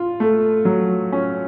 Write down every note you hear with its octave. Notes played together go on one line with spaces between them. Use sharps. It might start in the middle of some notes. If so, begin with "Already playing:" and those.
Already playing: F4
A3
F#3
C#4